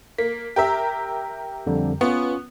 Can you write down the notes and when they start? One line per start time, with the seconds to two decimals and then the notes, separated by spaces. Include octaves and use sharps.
0.18 A#3 B6
0.56 G4 A#4 E5
1.66 F2 D3 G3
2.01 B3 C#4 F4 C#6